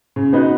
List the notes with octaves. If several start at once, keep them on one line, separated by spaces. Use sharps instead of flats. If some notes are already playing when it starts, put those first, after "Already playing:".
C#3
B3 D#4 F#4 B4